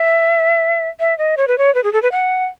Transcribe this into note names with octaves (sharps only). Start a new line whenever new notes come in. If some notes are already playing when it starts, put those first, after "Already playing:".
Already playing: E5
E5
D#5
C#5
B4
C#5
B4
G#4
A4
B4
F#5